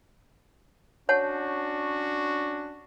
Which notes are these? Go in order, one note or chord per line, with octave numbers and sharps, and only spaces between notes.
C#4 D4 F#4 C#5 F#5 A5